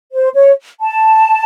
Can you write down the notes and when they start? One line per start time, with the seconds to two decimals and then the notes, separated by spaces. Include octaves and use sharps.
0.13 C5
0.34 C#5
0.80 A5